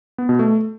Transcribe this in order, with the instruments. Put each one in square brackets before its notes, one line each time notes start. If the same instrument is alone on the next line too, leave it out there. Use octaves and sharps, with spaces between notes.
[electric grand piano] B3
B2
A3